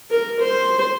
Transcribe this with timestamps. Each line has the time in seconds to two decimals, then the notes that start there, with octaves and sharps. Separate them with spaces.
0.11 A#4
0.41 C5